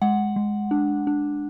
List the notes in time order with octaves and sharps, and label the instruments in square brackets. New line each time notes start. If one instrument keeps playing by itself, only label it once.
[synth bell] G#3 F#5
G#3
D4
D4